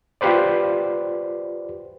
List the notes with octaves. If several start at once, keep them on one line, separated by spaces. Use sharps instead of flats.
F4 G4 B4 C5 D5